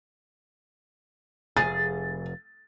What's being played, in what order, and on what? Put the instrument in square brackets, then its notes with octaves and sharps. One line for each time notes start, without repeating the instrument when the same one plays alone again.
[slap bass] F1 [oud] G#4 [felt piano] A6